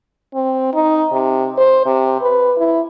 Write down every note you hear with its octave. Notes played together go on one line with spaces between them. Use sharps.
C4
D#4
C3
C5
C3
B4
E4